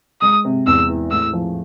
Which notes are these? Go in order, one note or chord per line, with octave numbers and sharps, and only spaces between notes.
G#3 D#6
C3
E2 E6
E3
A2 E6
F3